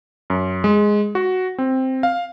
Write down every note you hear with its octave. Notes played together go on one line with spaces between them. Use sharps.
F#2
G#3
F#4
C4
F5